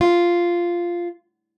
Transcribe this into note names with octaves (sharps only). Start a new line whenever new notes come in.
F4